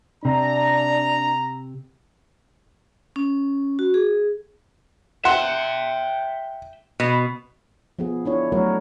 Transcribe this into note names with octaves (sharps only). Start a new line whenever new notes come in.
C3 D4 A#5
C#4
F#4
G#4
E5 F#5 G5 C6
B2
F3 B3 G#4
D4 E4 C#5
F#3 A3 D4 F#4 A#4 C#5